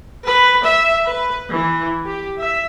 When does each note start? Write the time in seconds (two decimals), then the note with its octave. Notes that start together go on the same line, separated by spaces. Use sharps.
0.24 B4
0.62 E5
1.08 B4
1.52 E3
2.06 G4
2.37 E5